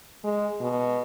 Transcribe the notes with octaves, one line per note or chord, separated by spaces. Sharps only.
G#3
B2